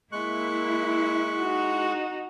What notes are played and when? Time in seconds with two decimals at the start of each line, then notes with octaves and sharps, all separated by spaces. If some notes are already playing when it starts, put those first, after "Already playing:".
0.12 G#3 A#3 E4 C#6 F#6
1.37 D#4 F#4